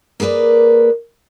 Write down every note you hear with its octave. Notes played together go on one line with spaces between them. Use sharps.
A#3 G#4 A#4 B4 D5